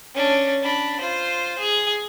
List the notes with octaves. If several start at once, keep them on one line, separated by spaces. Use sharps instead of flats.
C#4 D4
D4 B5
F4 C5
G#4